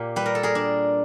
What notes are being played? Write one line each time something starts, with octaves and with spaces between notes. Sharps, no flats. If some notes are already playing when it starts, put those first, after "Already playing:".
Already playing: A#2 A#3 G4
G3 B4
A#4
A4
G#4 A#4
D4